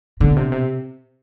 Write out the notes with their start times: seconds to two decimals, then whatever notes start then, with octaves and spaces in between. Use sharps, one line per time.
0.20 B2 D3
0.37 C3
0.52 C3